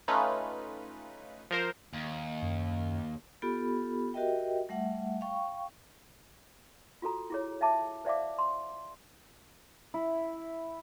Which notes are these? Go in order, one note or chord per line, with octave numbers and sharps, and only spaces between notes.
A3 C#4 D#4 F4 B4
F3 A#4 C5
D#2
F#2
B3 F4 G4 A4 B5
F#4 G4 A#4 D#5 E5 G5
G3 A3 E5 F#5
F5 G5 C#6
F4 F#4 A4 A#5
E4 G#4 C#5
D#5 E5 A5 D6
C5 D5 E5 F5 D6
C6
E4